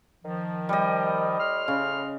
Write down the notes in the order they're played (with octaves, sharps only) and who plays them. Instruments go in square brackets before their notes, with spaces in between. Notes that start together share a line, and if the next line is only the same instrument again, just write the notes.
[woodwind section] D#3 F3
[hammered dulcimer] G3 D#5
[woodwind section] A2 C6 F6
[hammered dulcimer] C#3